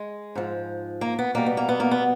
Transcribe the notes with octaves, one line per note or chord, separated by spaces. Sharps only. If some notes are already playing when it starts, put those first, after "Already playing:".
Already playing: G#3
G#2 F3
A#3
B3
B2 G3 A#3
B3
A#3
B3
A#3
B3